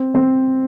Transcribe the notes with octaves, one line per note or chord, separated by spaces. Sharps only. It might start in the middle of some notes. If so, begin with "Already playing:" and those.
Already playing: C4
C4